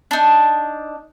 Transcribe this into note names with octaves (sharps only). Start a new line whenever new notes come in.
D4 D#4